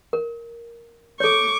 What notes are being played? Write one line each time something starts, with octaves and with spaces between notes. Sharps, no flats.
A#4
A4 C#5 C#6 D6